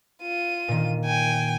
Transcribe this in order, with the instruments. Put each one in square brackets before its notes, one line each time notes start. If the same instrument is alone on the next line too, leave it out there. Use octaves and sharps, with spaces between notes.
[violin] F4 D#7
[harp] A#2 D#3
[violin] G5 G#5